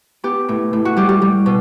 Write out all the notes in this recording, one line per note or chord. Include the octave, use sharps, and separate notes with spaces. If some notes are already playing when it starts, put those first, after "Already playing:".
B3 G4
A2
A2
F#4
G3 G4
G4
G3
B2